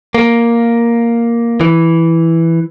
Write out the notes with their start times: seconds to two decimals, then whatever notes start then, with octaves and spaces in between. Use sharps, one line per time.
0.14 A#3
1.61 E3